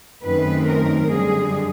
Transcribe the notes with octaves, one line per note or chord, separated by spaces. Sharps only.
F#2 D#3 F#3 A3 C4 B4
A#4
F#2 D3 G3 G#4